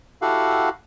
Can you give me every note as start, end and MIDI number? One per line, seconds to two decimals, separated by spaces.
0.22 0.69 64
0.22 0.69 66
0.22 0.69 67
0.22 0.69 69
0.22 0.69 77
0.22 0.69 78